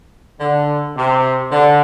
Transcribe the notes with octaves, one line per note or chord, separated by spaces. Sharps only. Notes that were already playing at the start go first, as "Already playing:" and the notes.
D3
C3
D3